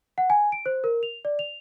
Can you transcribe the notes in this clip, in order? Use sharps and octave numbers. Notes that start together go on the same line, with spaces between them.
F#5
G#5
D7
C5
A#4
F7
D5
F7